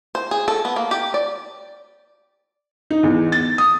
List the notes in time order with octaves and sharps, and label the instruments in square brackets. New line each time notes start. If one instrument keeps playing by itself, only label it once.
[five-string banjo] C5
G#4
A4
B3
A#3
G4
D5
[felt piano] D#4
E2
A6
D#6